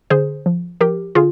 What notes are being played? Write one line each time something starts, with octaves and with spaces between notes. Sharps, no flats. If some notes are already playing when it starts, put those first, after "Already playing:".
D3 G#4 C5
F3
F3 G4 A#4
D3 F4 G#4